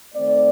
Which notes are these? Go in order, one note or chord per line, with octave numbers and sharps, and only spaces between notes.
D#3 A3 C4 D5